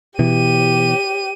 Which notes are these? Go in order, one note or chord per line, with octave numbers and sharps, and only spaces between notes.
B2 E3 G4 D#7